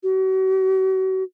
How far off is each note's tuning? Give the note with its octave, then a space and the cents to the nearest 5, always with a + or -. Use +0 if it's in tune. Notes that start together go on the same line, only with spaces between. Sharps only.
F#4 +40